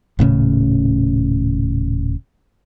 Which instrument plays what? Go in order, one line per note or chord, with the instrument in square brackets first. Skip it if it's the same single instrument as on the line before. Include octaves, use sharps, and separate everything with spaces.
[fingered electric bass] D#1 A2 C#3 C#4